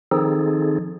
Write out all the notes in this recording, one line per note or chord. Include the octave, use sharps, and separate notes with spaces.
D#3 F3 C4 D#4 G#4 A4